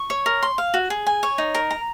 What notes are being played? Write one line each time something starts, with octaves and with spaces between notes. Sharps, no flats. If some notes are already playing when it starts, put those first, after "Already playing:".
Already playing: C#6
C#5
A#4
C6
F5
F#4
G#4
G#5
C#5
D#4
A#4
A#5